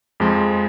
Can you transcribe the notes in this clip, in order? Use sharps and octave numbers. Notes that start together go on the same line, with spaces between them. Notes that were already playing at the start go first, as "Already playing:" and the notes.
F2 F3 G#3